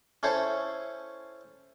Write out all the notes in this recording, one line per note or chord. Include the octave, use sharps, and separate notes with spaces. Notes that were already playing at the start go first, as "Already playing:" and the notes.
C#4 E4 A4 C5 C#5